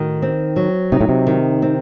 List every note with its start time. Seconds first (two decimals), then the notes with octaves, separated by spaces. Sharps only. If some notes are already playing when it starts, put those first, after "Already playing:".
Already playing: A2 D#3 F#4
0.22 C4
0.56 F#3
0.92 C3 D#4
1.01 A2
1.09 C3
1.27 D#3
1.62 C4